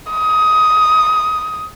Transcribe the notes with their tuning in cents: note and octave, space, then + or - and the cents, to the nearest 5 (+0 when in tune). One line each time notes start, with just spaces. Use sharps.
D#6 +15